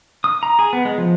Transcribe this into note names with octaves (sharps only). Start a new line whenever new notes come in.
D#6
A#5
G#4
B3
G#3
F3